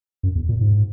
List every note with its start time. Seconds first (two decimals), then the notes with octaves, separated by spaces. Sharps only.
0.23 F#2
0.35 E2
0.49 A#2
0.61 G#2